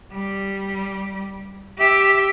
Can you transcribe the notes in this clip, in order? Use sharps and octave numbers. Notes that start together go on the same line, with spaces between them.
G3
G4 E5